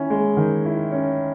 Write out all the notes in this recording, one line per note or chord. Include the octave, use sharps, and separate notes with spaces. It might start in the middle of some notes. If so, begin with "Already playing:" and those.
Already playing: D#3 C#4 E4
G#3
D#3
E4
C#4